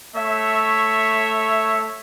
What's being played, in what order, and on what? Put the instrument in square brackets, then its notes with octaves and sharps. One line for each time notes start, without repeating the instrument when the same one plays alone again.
[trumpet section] A3 C#5 E5